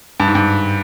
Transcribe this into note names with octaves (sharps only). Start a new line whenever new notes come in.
G2
G#2
G2